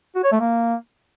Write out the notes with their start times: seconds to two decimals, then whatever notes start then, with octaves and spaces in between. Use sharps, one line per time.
0.16 F#4
0.24 C#5
0.32 A3
0.40 A#3